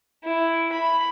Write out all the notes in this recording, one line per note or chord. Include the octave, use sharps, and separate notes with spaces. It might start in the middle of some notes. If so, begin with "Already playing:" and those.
E4
B5